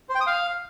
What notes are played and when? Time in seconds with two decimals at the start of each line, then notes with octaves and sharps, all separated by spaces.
0.09 C5
0.15 G5
0.21 D#6
0.27 F5